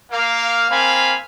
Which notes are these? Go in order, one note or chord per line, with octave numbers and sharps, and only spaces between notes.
A#3 F5
A#3 C4 F5 G#5 B5